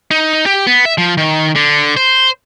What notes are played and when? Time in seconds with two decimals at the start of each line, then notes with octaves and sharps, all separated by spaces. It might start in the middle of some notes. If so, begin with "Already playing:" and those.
0.11 D#4
0.46 G4
0.67 B3
0.85 E5
0.98 F3
1.18 D#3
1.56 D3
1.97 C5